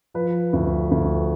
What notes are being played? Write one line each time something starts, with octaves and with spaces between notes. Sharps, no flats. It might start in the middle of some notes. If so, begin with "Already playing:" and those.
F3 B4
D2
D2